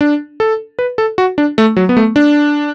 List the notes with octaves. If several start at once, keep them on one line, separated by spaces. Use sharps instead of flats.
D4
A4
B4
A4
F#4
D4
A3
F#3
B3
A3
D4